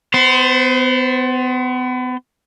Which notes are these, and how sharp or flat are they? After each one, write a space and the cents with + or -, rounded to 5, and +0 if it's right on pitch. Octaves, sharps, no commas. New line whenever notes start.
B3 +35 C5 +0